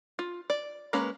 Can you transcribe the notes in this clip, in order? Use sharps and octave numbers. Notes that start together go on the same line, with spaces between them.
F4
D5
G#3 A#3 C#4 B4 A#5